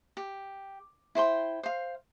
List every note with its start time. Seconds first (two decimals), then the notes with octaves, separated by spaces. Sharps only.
0.17 G4
1.15 E4 C5 G5 C6
1.63 C5 F5